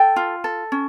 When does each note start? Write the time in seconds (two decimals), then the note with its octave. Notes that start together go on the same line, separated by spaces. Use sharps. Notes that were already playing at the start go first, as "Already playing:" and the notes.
Already playing: A4 G5
0.16 F4
0.44 A4
0.72 C#4